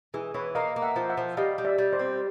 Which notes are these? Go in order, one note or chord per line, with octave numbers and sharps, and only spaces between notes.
E3 G#4
E3 B4 C#5
A#3 D#5 F5
A#3
E5 F#5
F3
E5 F#5
F3
G3 D#5 F5
G3
D5 E5
G3
C5 D5
C4